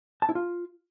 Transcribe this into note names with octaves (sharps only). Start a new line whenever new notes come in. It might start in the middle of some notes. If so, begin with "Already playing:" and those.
A5
E4
F4